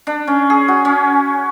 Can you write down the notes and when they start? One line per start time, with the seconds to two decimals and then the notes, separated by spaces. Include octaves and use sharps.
0.07 D4
0.27 C#4
0.50 G#4
0.68 F#4
0.85 C#4